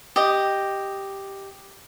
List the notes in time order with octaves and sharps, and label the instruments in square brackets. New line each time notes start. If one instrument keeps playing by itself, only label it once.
[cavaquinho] G4 D#5